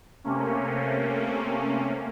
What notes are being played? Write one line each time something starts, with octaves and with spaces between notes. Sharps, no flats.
C3 A3 A#3 C#4